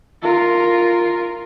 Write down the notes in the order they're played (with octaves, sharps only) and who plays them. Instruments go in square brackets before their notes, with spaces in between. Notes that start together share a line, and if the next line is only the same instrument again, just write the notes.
[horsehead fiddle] F4 A#4